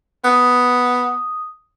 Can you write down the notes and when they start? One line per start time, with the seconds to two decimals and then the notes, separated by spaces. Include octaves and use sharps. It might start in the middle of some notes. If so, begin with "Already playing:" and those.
0.24 B3 D#6